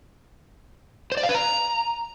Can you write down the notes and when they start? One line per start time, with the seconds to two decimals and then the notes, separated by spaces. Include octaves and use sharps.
1.12 C5
1.17 D5
1.23 F5
1.29 B4
1.35 A#5